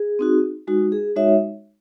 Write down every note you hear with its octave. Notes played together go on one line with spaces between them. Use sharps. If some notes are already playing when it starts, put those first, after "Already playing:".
Already playing: G#4
C4 D#4 F#4
G#3 D#4 F#4
G#4
G#3 D#4 F#4 C#5 E5